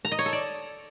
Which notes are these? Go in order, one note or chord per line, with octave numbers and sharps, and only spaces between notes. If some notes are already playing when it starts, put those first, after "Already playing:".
A#5
D#5
C#5
A4
D5